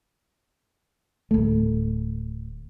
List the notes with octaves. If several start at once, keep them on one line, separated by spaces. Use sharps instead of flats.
D1 A3